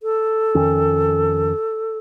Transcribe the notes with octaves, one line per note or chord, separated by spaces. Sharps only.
A4
F2 D#3 C#4